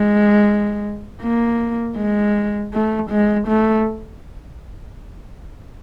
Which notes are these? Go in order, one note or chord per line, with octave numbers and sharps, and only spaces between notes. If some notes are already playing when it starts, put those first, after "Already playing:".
Already playing: G#3
A#3
G#3
A3
G#3
A3